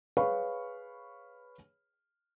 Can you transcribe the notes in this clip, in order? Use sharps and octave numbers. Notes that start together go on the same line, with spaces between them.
G#4 B4 C#5 F5 B5 C#6